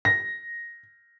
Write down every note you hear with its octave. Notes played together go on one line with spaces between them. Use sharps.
A#6